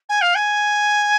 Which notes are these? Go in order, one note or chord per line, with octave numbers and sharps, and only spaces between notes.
G#5
F5
G#5